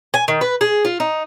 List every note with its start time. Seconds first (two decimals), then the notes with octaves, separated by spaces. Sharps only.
0.14 G#5
0.28 D#3
0.41 B4
0.61 G#4
0.85 F4
1.00 D#4